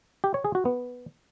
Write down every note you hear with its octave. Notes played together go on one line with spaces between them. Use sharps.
G4
C#5
G#4
F#4
B3